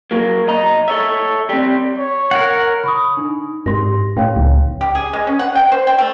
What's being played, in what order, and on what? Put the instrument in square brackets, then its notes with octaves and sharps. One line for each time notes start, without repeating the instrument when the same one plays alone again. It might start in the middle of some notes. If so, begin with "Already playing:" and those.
[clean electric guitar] F#3 A#3
B1 D#5 A#5
A4 C#5 E5
G3 C4
[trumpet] C#5
[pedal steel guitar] A#4 F#5
[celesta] B5 C#6 D#6
D4 D#4
[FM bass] G#2 [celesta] G4 C6 A#6
[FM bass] A2 [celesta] C#5 F5 G5
[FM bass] C#2
[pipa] G4
G#4
G#3
C#4
F#5
G5
C5
G5
A3